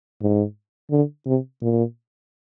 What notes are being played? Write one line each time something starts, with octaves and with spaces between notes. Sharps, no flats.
G#2
D3
C3
A#2